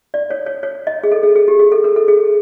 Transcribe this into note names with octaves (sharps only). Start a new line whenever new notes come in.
D5
C#5
C#5
C#5
D#5
G#4
A4
G#4
G#4
G4
G#4
A4
A#4
A4
G#4